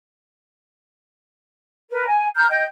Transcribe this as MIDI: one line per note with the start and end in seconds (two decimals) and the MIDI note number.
1.90 2.06 70
1.90 2.06 71
2.07 2.27 80
2.35 2.48 82
2.35 2.48 89
2.35 2.48 91
2.49 2.64 75
2.49 2.64 79
2.49 2.64 91